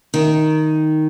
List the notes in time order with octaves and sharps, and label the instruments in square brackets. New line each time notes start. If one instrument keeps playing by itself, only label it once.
[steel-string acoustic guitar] D#3